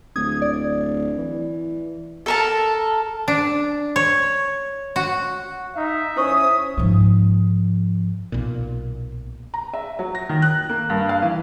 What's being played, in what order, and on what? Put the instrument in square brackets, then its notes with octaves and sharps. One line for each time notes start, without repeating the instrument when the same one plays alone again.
[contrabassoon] D1 [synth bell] D#6 G#6
[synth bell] D5
[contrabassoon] E3
[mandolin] A4 A#4 A5
[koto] D4
C#5
F#4
[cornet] D#4 [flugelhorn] E5
[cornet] C#4 [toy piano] E4 C5 C#6 [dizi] D#6
[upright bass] G#2 F3
[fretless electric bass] B1 A#2
[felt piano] A#5
E5
F#3
A#6
D#3
F#6
A#3
G2
F5
E3